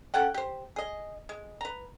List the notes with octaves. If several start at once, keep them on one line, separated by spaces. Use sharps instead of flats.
C#4 A4 F#5 G5
G4 C5
G#4 D#5
G#3
B4 A#5